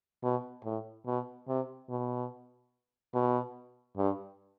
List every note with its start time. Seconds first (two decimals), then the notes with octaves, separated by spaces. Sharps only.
0.23 B2
0.64 A2
1.06 B2
1.48 C3
1.89 B2
3.14 B2
3.97 G2